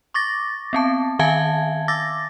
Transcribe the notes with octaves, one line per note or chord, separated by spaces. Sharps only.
C#6 D6 A6 A#6
B3 C4 A5
D#3 E5 F5 G#5 A5 G#6
D6 E6 A6 A#6